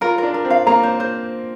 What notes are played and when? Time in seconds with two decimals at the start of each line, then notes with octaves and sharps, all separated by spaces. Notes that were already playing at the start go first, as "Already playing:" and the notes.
0.01 F4 A#4
0.18 D4 A#4
0.34 A#4
0.45 C4
0.50 F5
0.67 A#3 A#5
0.83 C5
1.00 C5